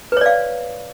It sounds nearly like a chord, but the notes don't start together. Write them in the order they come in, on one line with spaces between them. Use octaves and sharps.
B4 C#5 D5 F5